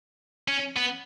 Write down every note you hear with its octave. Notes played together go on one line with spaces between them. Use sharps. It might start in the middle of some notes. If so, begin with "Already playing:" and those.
C#4
B3